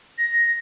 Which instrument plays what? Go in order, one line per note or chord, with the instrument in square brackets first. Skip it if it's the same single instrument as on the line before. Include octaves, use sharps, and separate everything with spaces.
[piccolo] A#6